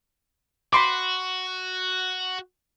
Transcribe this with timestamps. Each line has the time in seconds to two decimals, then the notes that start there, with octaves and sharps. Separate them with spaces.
0.73 F#4 B5 C6 D6